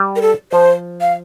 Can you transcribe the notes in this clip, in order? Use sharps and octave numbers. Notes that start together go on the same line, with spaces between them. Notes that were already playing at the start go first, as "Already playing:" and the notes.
Already playing: G3
A#4
A4
F3 C5
F5